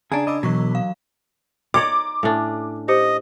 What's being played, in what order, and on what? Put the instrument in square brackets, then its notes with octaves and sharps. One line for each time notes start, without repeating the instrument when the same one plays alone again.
[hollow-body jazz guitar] C#3 D4 [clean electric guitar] G#4 [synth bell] A5 A#5 G#6
[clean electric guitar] D#5 [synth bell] B5 D6 E6
[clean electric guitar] B2 [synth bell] E3 C#6 B6 [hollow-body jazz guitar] F#3
[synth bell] F5
[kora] D#4 C#5 D5 [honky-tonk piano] D6
[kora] A2 C#4 D4
[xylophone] G4 C5 C#7 [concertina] D#5